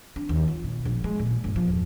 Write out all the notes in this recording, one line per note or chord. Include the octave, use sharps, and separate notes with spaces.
D4
D#2
F4
B2
A#1
G#3
A#2
G1
F3
E2